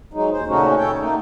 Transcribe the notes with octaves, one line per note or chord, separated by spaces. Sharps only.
F#3 G#3 D#4
D#2 C5
A#2 C#3 A3 C#4 D#4 F#4
F#2 A4 C#5 G5
A3 A#3 D#4